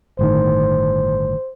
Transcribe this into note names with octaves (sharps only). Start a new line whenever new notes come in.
G1 A2 D#3 C5